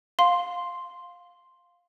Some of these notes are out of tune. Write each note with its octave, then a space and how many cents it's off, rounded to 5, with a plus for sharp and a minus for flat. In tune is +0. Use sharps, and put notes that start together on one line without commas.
F5 +15 C6 +0